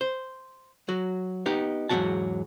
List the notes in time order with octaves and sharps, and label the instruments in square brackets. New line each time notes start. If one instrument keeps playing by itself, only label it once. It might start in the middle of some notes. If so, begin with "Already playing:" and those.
[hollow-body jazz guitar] C5
F#3 F#4
B3 D#4 G4
E2 G#2 F3 F#3 F#4 A5